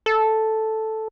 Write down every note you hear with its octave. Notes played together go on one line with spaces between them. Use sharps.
A4